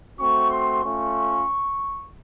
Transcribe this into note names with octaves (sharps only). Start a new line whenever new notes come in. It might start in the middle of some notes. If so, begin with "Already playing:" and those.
A3 C4 F#4 C#6
C6
A3 C#4 F4 C#6